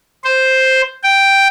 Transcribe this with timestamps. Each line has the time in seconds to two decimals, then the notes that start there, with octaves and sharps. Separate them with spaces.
0.24 C5
1.04 G5